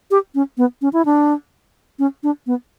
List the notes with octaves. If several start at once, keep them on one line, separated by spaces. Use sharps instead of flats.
G4
C#4
B3
C#4
E4
D4
C#4
D4
B3